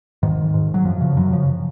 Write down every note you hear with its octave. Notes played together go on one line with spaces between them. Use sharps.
G#2 D#3
G#2
F#3
F#2 F3
C#3 F3
F#2 F#3
C#3 F3